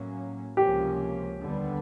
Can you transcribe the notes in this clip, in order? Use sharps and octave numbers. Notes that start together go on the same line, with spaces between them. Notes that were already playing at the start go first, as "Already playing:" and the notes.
Already playing: A2 F#3 A#3 C#4
C#2 C3 F3 A#3 C#4 G4
D#2 D3 G3 B3